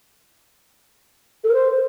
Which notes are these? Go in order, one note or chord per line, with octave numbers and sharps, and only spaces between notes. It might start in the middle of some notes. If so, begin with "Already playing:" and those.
A4
A#4
C5